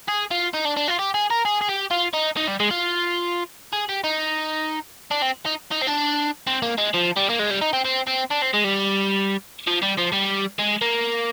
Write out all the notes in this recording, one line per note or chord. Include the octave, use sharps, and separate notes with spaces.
G#4
F4
D#4
D4
D4
F4
G4
G#4
A#4
G#4
G#4
G4
F4
D#4
D#4
G3
G#3
F4
G#4
G4
D#4
D4
C4
D#4
D#4
C4
D4
C4
A#3
G#3
F3
G3
A#3
G#3
G3
D#4
C4
C4
C4
D4
C4
G#3
G3
F3
G3
F3
G3
G#3
A#3